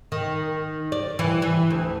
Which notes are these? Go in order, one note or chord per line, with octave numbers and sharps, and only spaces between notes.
D#3
D5
E3
E3
D2